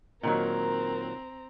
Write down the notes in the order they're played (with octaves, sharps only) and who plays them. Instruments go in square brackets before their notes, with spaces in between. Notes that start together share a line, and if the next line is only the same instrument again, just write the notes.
[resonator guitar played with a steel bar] A#2 D#3 F#3 [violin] C4 A#5 [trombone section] A#4